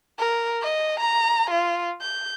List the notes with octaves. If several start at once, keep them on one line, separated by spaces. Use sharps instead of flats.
A#4
D#5
A#5
F4
G6